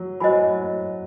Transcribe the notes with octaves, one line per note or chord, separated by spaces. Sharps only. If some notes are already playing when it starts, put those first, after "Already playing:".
Already playing: F#3
F#3 C5 D#5 G#5 B5